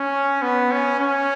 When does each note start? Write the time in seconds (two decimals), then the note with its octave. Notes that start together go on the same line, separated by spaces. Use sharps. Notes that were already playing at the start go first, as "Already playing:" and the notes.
Already playing: C#4
0.42 B3
0.71 C#4
1.00 C#4